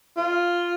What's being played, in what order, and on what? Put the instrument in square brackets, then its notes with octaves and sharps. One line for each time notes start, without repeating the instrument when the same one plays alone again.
[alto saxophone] F4